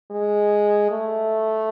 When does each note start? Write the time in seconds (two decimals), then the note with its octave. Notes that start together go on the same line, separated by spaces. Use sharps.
0.11 G#3
0.91 A3